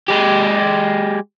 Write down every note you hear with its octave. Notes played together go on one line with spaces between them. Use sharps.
G#3 G4